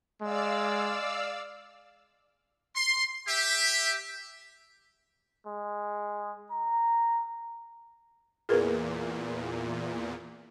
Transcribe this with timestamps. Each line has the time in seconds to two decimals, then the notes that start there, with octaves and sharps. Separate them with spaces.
0.22 G#3 D5 F5 E6
2.76 C6
3.28 G4 E5
5.46 G#3
6.51 A#5
8.49 E2 A#2 G#4 A#4 B4